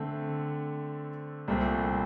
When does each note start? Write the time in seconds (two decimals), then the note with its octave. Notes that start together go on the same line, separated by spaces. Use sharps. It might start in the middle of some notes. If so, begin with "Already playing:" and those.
Already playing: D3 A3 C4
1.48 C2 A#2 A3 C4